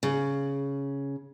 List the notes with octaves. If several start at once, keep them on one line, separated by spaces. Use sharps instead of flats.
C#3